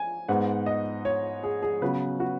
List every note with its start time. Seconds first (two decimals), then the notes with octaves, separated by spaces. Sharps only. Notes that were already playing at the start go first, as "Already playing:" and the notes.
Already playing: G#5
0.29 G#2 G#3 B3 F#5
0.66 D#5
1.05 C#5
1.43 G#4
1.63 G#4
1.82 C#3 F#3 B3 B4
2.20 F#4